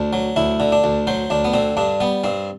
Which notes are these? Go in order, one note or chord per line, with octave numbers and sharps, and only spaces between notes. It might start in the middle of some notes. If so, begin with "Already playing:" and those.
Already playing: D2 D4
F#3
D2 E4
D3
D4
D2
F#3 C5
D2 D4
B3
D3 C4
G2 D4
G3 B3
G2 C4